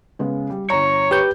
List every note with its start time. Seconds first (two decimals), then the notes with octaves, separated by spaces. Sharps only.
0.19 C#3 G#3 B3
0.50 G3
0.70 G1 C#5 A#5
1.11 G4 B4 G6